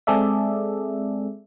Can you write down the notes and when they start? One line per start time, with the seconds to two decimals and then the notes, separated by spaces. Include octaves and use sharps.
0.07 G#3 C4 G#4 A4 D5 E5